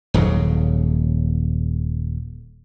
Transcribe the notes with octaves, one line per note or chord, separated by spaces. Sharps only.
D#1 D#2 C#3 F#3